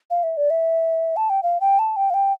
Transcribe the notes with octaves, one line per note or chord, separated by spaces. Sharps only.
F5
E5
D5
E5
A5
G5
F5
G5
A5
G5
F5
G5